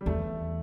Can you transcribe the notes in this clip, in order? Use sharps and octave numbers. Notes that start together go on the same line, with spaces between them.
G3
E2 A3